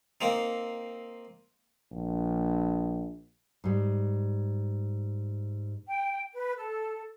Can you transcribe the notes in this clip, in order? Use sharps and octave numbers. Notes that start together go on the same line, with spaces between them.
A#3 C4 D#4
A#1
G#2 G3
G5
B4
A4